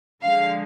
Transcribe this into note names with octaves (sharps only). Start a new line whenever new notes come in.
D3 F3 G#3 F5